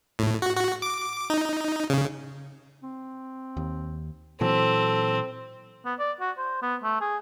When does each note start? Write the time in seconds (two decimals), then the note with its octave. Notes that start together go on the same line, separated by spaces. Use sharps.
0.19 A2
0.42 F#4
0.56 F#4
0.82 D6
1.30 D#4
1.90 C#3
2.82 C4
3.57 D#2
4.41 A#2 E3 F#3 C4 A4
5.85 B3
5.99 D5
6.20 F#4
6.38 C5
6.62 B3
6.83 A3
7.01 G#4